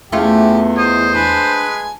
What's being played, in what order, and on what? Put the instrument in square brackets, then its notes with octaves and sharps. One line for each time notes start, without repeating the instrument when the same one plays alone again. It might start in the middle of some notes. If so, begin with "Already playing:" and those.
[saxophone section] E2 [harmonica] E3 G4 [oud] A3 C#4 F4
[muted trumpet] C5 [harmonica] D#5
[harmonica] G#3 B4 G#5 [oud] D4